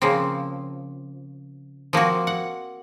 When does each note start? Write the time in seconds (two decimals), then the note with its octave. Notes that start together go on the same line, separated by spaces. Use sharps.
0.02 C#3 F3 A#3 C4
1.93 F3 A#3 C4 F#4
2.27 F#5